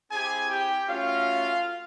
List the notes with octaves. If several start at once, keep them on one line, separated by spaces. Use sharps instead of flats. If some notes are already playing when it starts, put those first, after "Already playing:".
C4 E4 G4 G#4 G#5
G4 G5
A3 C#4 F4 F#4 F5